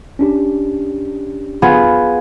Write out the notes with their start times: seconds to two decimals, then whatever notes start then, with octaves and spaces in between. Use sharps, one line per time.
0.19 C#4 D4 G4
1.62 B3 F4 G#4